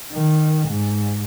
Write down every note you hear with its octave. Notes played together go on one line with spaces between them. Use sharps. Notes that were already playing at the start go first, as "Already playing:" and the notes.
D#3
G#2